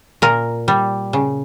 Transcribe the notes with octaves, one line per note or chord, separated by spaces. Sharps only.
A#2 A#4
G3
C#3